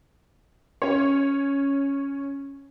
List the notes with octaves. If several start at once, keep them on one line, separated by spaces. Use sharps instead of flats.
C#4 C#5